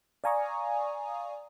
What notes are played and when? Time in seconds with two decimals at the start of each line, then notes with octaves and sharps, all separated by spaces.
0.24 D5 F5 G#5 A#5 C#6 D#6